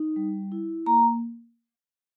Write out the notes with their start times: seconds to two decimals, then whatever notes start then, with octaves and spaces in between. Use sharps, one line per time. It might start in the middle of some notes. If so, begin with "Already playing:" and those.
Already playing: D#4
0.16 G3
0.52 E4
0.86 A#3 A#5